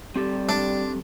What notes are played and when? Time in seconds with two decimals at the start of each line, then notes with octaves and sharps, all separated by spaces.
0.16 G3 C4 G4 A4
0.49 D4